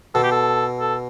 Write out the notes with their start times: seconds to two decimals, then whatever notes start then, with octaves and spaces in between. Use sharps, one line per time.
0.15 B2 A4
0.23 G4
0.31 A4
0.80 A4